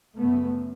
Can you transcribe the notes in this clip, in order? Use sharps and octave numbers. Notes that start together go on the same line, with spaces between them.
F#2 C#3 A3 B3